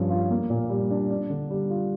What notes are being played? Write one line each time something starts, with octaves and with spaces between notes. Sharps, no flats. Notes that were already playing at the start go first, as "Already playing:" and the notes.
Already playing: G2 F3 C#4
F4
A#3
A#2
G3
D4
D4
D3
G3
F4